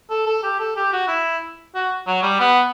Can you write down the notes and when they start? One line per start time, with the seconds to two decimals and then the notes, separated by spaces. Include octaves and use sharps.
0.10 A4
0.26 A4
0.43 G4
0.60 A4
0.76 G4
0.93 F#4
1.08 E4
1.75 F#4
2.07 F#3
2.23 G3
2.40 B3